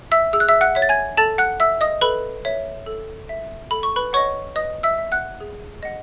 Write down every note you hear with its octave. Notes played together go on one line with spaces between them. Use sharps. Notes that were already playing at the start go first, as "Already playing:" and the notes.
E5 E6
G#4 E6
F#6
E5 E6
F#5 F#6
C#5 E5
A6
G#5 G#6
A4 A5 A6
F#5 F#6
E5 E6
D#5 D#6
A4 B4 B5
C#5 E5
A4
E5
A4 B5
C#6
B4 B5
C#5 D#5 F#5 C#6
B4 D#5 D#6
E5 E6
E5
F#5 F#6
G#4
D#5 F#5